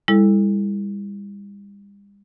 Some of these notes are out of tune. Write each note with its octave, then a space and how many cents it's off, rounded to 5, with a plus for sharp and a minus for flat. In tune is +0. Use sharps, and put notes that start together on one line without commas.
G3 +45 E4 +0 A4 +0